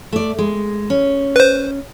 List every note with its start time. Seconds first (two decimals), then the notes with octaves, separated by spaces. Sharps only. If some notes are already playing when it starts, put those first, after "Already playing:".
0.13 A3 D5
0.38 G#3
0.90 C#4
1.36 B4 C5